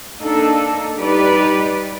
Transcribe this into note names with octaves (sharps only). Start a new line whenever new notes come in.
A#3 D4 D#4 A4
G3 D#4 G4 B4 D5